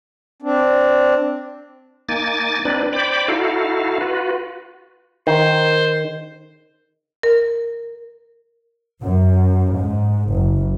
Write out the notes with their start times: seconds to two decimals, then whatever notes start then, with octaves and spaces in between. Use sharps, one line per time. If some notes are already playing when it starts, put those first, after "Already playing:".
0.42 C4 D4
2.09 A#3 D#4 G#5 D6 A6
2.65 C4 D4 D#4 B4 D5
2.93 C5 D5 G5 B5 D6
3.28 D#4 E4 F#4 A4 F5
4.01 F4 F#4 B4
5.27 D#3 C5
7.23 A#4
9.02 F#2
9.75 G#2
10.29 F#1